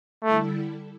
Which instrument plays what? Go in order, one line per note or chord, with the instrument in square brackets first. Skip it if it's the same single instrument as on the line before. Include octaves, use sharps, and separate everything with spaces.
[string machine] D3 G3 E4 A4 [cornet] A3